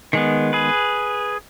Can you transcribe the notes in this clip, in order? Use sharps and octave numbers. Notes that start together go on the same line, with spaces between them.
D#3 G#3 B3
G#4 B4